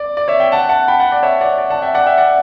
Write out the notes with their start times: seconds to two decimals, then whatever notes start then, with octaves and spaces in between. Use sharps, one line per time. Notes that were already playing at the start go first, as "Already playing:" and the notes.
Already playing: D5
0.17 D5
0.28 C#5 E5
0.40 E5 G5
0.52 F#5 A5
0.69 F#5 A5
0.88 G5 B5
1.00 F#5 A5
1.12 D5
1.23 C#5 E5
1.41 D5 F#5
1.58 D5
1.70 F#5 A5
1.82 E5 G5
1.94 D5 F#5
2.06 E5 G5
2.17 D5 F#5